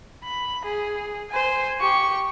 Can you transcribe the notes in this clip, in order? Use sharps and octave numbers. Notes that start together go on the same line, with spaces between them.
B5
G#4
C5 G#5
G4 C#6